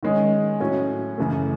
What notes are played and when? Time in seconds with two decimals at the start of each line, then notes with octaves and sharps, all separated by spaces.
0.03 D#3 G#3 C#4 G#4
0.60 A2 F#3 C#4
1.18 F#2 C#3 E3 A3